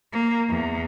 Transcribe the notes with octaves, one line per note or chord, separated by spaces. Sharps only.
A#3
E2